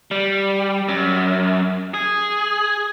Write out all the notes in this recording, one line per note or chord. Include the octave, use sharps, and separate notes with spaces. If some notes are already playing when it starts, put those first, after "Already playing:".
G3
F#2
G#4